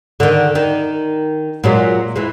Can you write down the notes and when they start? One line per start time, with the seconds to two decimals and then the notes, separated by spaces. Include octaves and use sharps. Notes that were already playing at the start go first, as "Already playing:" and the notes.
0.20 D3 D#3
0.55 D#3
1.64 A#2 F#3 G#3
2.16 E3 G#3